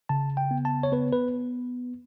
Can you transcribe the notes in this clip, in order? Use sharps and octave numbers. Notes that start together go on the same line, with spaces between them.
C#3 A5
G5
B3
A5
C#5
B3 B4
B4